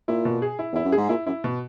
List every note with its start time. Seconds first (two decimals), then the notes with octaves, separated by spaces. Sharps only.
0.08 A#2 E4
0.25 B2
0.42 G#4
0.59 E4
0.72 E2 E4
0.84 F#2
0.92 G#2 G#4
1.09 A#2 E4
1.26 F#2 E4
1.44 B2